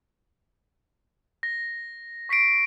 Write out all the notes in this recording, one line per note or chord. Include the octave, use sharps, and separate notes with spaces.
A#6
C#6 B6 C7 D7